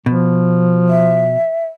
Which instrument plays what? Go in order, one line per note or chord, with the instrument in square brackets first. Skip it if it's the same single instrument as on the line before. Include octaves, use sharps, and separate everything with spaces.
[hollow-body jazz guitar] B2 [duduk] F3
[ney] E5